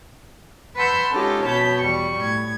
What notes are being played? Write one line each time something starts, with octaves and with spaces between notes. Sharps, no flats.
B4 F#5 A5 C6 E6 G6
G#3 C#4 D#4 F4 G4 A4
B2 C#5 A5 B5 G6
E2 G3 C#6
A2 G#6